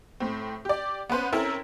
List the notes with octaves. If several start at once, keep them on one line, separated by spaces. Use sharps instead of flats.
A2 C4
G4 D5
B3 C#4 B4 C5
C4 C#4 E4 A4 A#4